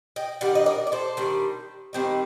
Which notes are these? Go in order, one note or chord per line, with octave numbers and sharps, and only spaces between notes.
D#5 G5
D#3 G3 D4 D5 F#5
D#5
A#4 D5
D5
A4 C5
D#3 G3 D4
D#3 G3 C4 D#4